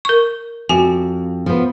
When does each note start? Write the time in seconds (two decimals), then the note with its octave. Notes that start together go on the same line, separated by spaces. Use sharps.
0.05 A#4 C#6
0.69 F2 F#4 G#5
1.46 F3 B3